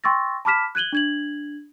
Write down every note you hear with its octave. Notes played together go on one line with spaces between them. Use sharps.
G5 C6 C#6 E6 A6 A#6
A5 B5 D6 F6 B6 E7
F#6 G#6 D#7 F#7 G7
D4 G#6 F#7